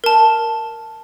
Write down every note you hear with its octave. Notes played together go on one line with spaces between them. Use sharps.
A#4 A5